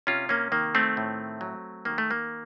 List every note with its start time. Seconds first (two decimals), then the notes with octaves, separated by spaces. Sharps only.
0.07 C3 C#4 F4
0.29 A#3 C#4
0.52 D#3 A#3
0.75 A3 C4
0.97 A2
1.41 F#3
1.85 D#3 A#3
1.98 A3
2.11 A#3